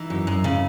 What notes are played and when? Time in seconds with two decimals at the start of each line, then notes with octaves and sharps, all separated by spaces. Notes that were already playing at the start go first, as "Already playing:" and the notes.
Already playing: E3 D#4
0.10 F#2
0.27 F#2
0.44 C#3